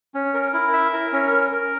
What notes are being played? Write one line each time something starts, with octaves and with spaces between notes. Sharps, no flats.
C#4
A#4
E4
E5
A#4
C#4
A#4
A#4